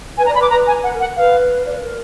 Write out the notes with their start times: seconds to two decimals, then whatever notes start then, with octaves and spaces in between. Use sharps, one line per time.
0.17 B4 G#5
0.26 A#5
0.28 D5
0.35 B5
0.39 B4 D6
0.50 B4 A#5
0.67 G#5
0.83 B4 F#5
0.94 A#4
1.00 F#5
1.16 B4 F5
1.66 D5
1.74 B4
1.82 A#4